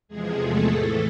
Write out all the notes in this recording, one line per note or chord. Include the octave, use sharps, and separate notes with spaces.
E2 C3 F3 G#3 G#4
A3 A4
A2 E3